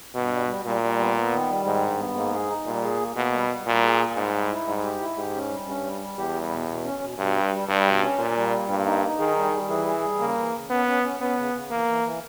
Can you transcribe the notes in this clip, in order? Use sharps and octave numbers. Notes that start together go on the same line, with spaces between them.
G2 B2
G3
G3
A#2 G3
G3
B3
B3
D#3
G3
G#2 D#3
G2
B3
G#2 A#3
G#4
D#4
A#2 G3
G#4
A#3
B2 A#3
G3
G3
A#2 G3
G#4
A#3
G#2 G3
G3
E4
G#2 G3
G4
E4
G#2 G4
C#4
G3
G2 C#4
G3
G3
E2 G4
G3
B2
B2
C#4
B2
G2 B2
G3
G3
G2 G3
B2
C#4
A#2 A#3
G3
A#3
G2 A#3
D#4
D#4
D#3 G#4
G3
G3
E3 G#4
G#4
G3
C#3 A#3
E3
C#3
B3 C#4
C#4
C#4
B3 C#4
C#3
C#3
E3 A#3
E3
E3